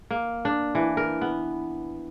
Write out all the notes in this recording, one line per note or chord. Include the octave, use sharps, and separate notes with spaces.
A#3
D4
E3
A#4
B3